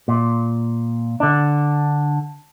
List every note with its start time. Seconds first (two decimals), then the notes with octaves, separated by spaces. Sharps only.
0.08 A#2
1.20 D3 D4